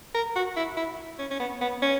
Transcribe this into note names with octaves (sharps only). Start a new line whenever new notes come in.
A#4
F#4
E4
E4
C#4
C#4
B3
B3
C#4